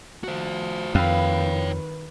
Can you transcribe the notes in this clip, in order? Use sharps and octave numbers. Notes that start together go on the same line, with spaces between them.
F3 F#4 C5
F2 D#3 B4 C#5 F5 G5 B5